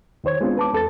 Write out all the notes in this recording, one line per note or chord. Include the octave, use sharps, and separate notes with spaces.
D#2 D#3 C5 C#5 G#6
G#3 B3 C4 D4 F4
B4 A5 D6
E2 A4 B4 A6